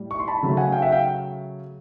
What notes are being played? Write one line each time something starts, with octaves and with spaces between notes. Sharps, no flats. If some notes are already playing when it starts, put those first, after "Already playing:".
Already playing: A2 G3
C#6
C6
A5 B5
C#3 F#3 A3
F#5 G#5
F5 G5
E5 F#5
F5 G5